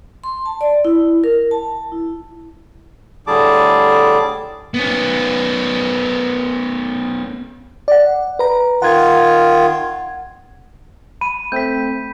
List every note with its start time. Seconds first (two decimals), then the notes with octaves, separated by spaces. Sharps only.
0.24 C6
0.46 A5
0.61 D5
0.85 E4
1.24 A#4
1.51 A5
1.92 E4
3.27 A2 D3 G3 G#4 A5 D6
4.74 B3 C#4
7.88 D5 F#5
8.39 B4 A#5
8.82 D#3 F4 F#5 G#6
11.21 B5 D#7
11.52 A3 C4 G6 B6